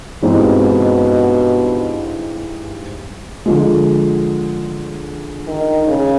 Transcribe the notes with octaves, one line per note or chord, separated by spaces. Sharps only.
G2 B2 E3 G#3 C4 D#4
D3 F3 G#3
D#3
C#3